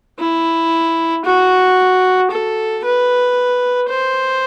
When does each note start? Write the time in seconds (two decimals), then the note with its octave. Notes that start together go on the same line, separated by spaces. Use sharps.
0.19 E4
1.25 F#4
2.31 A4
2.84 B4
3.90 C5